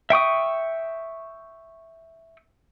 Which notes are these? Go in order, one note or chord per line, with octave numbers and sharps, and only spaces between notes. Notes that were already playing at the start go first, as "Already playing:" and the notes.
E5 G5 C#6 D#6